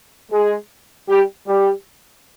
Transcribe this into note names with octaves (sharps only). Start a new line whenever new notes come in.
G#3 G#4
G3 G4
G3 G4